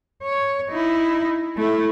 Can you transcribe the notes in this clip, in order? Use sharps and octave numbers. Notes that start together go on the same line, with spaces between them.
C#5
D#4 E4
A3 E4